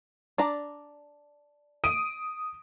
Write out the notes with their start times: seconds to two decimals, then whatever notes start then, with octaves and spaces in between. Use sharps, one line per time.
0.38 D4 D5 A#5
1.84 D#6 D7 D#7